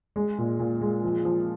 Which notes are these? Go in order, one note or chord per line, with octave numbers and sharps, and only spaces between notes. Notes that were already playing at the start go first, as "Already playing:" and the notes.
G#3
A#2
A#2
G#3
F3
F3